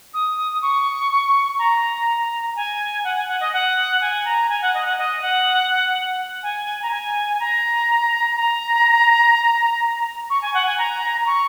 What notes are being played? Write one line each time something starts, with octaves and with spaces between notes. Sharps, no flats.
D#6
C#6
A#5
G#5
F#5
G#5
F#5
D#5
F#5
G#5
A#5
G#5
F#5
D#5
F#5
D#5
F#5
G#5
A#5
G#5
G#5
A#5
A#5
C#6
G#5
F#5
G#5
A#5
A#5
C#6